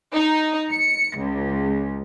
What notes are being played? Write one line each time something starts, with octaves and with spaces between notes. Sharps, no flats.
D#4
C#7
C#2